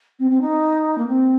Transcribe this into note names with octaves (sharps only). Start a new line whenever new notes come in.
C4
C4
D#4
A#3
C4